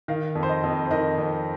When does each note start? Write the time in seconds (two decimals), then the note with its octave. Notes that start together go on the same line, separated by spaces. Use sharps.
0.08 D#3 F5
0.35 F2
0.43 C5
0.49 D#5
0.63 F2
0.86 C5
0.91 D#3 D#5
1.18 F2